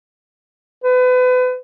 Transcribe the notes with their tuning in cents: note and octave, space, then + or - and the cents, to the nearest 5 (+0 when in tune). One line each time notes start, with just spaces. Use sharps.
B4 +35